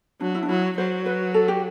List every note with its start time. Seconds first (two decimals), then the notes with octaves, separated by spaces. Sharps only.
0.21 F#3 D4
0.35 E4
0.43 D4
0.49 F#3 E4
0.77 F#3 C5
1.06 B4
1.34 A4
1.48 G4